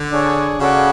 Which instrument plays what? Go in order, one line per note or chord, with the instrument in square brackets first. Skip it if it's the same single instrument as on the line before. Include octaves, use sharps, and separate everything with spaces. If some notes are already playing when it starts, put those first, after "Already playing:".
Already playing: [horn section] D3
[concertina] D4 G#4 C#5
[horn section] C#3 [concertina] F#4 A4 D5 F#5